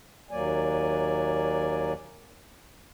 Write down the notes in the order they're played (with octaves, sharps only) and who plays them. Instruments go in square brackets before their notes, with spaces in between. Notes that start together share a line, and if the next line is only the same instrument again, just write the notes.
[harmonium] D#2 F#3 A#3 D5 G#5